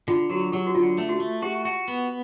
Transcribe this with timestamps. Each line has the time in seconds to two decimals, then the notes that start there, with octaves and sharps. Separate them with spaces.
0.08 D3 F4
0.30 F#3 F#4
0.52 F#3 G4
0.67 F#4
0.75 D3 F4
0.98 A3
1.09 F#4
1.20 A3
1.42 F#4 G4
1.65 F#4
1.88 B3